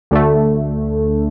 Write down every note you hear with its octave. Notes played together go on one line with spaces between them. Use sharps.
D2 D3 A3